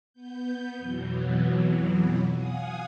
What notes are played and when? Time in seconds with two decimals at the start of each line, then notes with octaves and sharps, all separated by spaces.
0.13 B3 G6
0.78 F2 B2 E3 F#3
2.33 F5 F#5 G#5 D#6